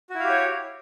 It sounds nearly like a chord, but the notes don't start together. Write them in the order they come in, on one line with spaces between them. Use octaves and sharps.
F#4 E4 F5 G4 C#5